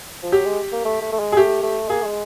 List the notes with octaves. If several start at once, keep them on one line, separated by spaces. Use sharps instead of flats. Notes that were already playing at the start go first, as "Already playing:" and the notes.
F3
F#3 G4
G#3
A#3
A3
A3
A3
G#3
G#4
A3 G4
A3
A#3 G#4
A3
G#3